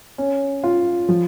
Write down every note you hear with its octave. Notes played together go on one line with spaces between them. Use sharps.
C#4
F4
F3